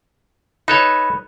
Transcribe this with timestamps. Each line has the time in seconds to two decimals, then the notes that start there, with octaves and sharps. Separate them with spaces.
0.68 D#4 A4 B4 C#5